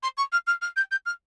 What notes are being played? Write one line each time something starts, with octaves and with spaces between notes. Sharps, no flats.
C6
C#6
F6
F6
F6
G6
G6
F6